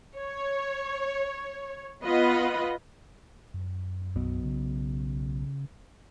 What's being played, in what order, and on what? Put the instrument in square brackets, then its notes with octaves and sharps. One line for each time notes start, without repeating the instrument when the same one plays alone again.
[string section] C#5
B3 F4 B4 D#5
[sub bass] F#2
[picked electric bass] B1 B2
[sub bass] C#3